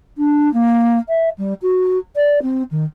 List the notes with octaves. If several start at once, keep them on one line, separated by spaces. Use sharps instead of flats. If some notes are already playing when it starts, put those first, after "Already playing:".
D4
A#3
E5
G3
F#4
D5
C4
D#3